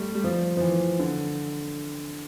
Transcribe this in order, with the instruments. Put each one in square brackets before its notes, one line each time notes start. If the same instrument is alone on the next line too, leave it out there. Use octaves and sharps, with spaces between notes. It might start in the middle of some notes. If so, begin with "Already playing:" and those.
Already playing: [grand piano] G3 A3
G3
F3
F3
E3
D3